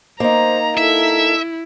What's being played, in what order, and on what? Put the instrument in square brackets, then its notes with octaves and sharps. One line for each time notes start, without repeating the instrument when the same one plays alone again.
[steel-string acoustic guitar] A#3 D#4 [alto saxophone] C5 [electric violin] A#5
[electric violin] E4 [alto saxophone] A4 [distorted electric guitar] E5